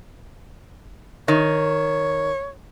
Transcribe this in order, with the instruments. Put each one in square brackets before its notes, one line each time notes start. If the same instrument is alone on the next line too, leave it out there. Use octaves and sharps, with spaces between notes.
[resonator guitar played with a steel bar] D#3 [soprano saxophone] C#5